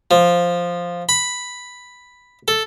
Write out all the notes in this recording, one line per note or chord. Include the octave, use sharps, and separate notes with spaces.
F3
B5
A4